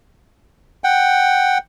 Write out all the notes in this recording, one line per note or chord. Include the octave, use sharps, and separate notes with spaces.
F#5 G5